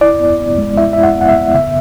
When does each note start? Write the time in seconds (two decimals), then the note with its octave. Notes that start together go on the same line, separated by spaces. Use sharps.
0.01 E4 D5
0.20 B3
0.40 B3
0.58 G#3
0.78 E4 E5
0.93 E4 E5
1.03 F#5
1.16 B3 F#5
1.29 E5
1.35 B3
1.54 C#3 E5